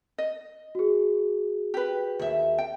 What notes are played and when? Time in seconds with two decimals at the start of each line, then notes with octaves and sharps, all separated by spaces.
0.18 D#5
0.75 F#4 G#4
1.74 G4 B4
2.19 D#2 E5
2.58 G5